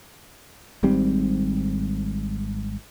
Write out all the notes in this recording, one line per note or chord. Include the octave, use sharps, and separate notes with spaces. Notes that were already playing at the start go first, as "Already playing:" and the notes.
G#1 G#2 G3 C4